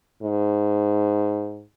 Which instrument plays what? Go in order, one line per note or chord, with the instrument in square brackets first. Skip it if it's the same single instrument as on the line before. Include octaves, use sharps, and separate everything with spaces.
[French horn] G#2